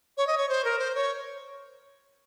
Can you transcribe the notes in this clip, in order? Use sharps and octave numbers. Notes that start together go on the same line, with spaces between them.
C#5
D#5
C#5
C5
A#4
C5
C#5